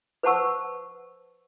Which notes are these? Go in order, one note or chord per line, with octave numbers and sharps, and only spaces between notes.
B4 C5 F#5 A5 C#6 E6